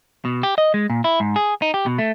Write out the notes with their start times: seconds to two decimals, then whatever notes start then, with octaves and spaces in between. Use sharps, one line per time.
0.25 B2
0.43 G4
0.58 D#5
0.74 G#3
0.90 A#2
1.04 E4
1.20 G#2
1.36 G#4
1.62 D#4
1.74 G4
1.86 B2
1.98 A3